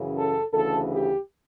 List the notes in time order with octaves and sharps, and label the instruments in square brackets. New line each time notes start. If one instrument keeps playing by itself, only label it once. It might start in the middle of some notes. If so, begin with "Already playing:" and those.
Already playing: [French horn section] F#2 C#3 E3
A4
D2 C#3 E3 A4
G4